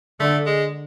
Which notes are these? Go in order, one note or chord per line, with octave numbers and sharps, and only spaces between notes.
D3 A3
G#3